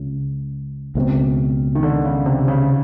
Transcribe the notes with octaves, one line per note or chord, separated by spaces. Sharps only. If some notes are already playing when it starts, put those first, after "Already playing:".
Already playing: C#2 C#3
C#2 B2 G#3 C4
D#3
D3
C#3
C3
C#3